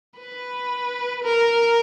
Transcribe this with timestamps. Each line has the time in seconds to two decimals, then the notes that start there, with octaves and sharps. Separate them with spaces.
0.19 B4
1.24 A#4